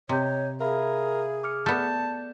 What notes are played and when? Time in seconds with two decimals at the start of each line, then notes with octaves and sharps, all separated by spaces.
0.09 C3 C#5 D#5 A#5 G6
0.61 G#4 A#4 E5 F5 B5
1.43 D6 F6 C#7
1.66 A3 B3 D5 A5 G6